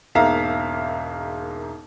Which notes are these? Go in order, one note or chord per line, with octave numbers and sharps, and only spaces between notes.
E1 G#2 A#3 E5 F5 A#5